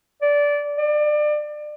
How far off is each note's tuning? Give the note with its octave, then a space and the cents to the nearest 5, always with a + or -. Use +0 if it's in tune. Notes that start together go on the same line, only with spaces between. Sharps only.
D5 -15
D5 +30